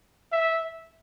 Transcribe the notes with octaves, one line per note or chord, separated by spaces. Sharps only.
E5